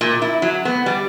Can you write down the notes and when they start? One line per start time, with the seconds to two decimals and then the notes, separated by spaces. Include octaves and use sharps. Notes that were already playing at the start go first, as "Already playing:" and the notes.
0.01 A#2
0.22 E4
0.42 F#3
0.65 B3
0.86 G3